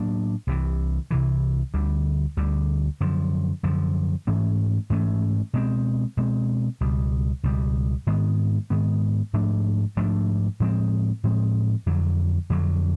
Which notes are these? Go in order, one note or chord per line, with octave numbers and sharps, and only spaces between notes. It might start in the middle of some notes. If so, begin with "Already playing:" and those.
Already playing: A2 F#3 A#3 D4
C2 C3 E3
C2 C3 E3
D2 D3 G3
D2 D3 G3
F#2 D3 F3
F#2 D3 F3
G#2 E3 A3 C#4
G#2 E3 A3 C#4
B2 G#3 C4
B2 G#3 C4
C#2 B2 G3
C#2 B2 G3
G#2 D#3 G#3 B3
G#2 D#3 G#3 B3
G#2 F3 A3 D4
G#2 F3 A3 D4
A2 F3 G#3 C4
A2 F3 G#3 C4
F2 D3 F#3
F2 D3 F#3